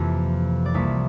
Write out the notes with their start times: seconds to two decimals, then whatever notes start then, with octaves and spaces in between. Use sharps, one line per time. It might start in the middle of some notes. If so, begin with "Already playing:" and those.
Already playing: F2 C3 E3 A#3
0.66 D5
0.74 C2 C3 F3 A#3 E5